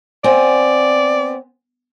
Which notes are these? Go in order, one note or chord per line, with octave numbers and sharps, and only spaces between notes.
B3 C4 D5 G#5